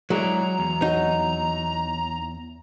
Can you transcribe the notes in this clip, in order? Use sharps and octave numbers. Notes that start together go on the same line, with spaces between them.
F#3 G#3 E4 D5 A#5
E2
F#3 D#4